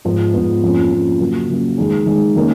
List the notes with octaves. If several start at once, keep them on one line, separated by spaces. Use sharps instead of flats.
G#2 F3 B3
G#2 F3 B3
F2 F3 A#3 C#4
F2 F3 A#3 C#4
C#3 F#3 A#3
C#3 F#3 A#3
D#3 G#3 D#4 G#4
D#3 G#3 D#4 G#4
D#3 A#3 C#4